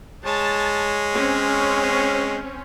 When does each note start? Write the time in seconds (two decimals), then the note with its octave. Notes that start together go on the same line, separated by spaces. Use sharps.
0.25 G#3 C#5 A5
1.14 C4 C#4